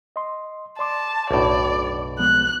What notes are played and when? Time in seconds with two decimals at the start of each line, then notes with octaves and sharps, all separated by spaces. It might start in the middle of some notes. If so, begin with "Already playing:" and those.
0.16 D#5 C6
0.79 D5 A5 C6 D6
1.31 B1 F#2 A2 D4 F#4 D5
2.19 F3 G#3 B3 F#6